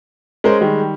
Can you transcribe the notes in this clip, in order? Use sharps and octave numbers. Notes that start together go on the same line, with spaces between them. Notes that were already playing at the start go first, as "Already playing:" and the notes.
G#3 C#4 A#4 C5
D#3 G3